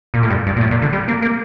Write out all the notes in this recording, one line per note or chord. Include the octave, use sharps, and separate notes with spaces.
A#2
A2
G2
G2
A#2
A2
A#2
D3
G3
A#3
A#3